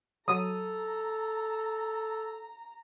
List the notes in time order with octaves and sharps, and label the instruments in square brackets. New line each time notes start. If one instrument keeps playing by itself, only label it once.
[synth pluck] F#3 [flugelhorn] A4 [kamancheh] A#5 [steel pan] D#6